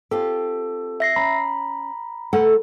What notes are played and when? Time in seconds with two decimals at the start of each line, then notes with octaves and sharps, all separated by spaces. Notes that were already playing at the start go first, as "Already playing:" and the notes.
0.11 C4 F4 G4 A4
1.00 E5 A#6 C7
1.16 C#4 A#5 B5
2.33 A3 A4 F#5